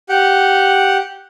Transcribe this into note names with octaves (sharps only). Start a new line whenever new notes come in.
G4 F#5